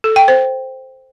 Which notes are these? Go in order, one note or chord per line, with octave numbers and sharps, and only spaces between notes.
A4
G5
C5